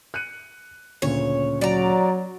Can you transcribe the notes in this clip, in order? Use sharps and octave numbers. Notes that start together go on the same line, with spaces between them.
F#6 C#7 D#7
D2 A#2 C#3 C#5
F#3 D5 A#5